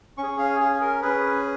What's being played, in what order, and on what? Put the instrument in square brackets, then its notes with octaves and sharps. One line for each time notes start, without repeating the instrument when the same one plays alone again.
[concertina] C#4 C#6
G#4
F5
G#4
A#4
C#4 G#4 B4